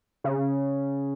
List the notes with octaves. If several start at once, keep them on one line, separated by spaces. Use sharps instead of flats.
C#3